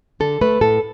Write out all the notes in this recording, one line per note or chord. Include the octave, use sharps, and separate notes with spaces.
D3 A4
A3 B4
A2 A4